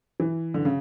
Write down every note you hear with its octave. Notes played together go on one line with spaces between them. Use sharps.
E3
D3
C#3